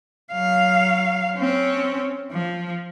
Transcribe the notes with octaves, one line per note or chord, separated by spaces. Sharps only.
F#3 F5
C4 C#4
F3